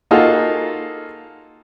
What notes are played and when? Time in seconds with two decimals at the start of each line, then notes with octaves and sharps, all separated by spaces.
0.11 A#3 D#4 F4 F#4 G#4 A4